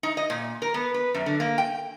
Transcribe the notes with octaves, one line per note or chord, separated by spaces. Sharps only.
D#4
D#5
A#2
A#4
B3
B4
F#2
D3
A#3
G5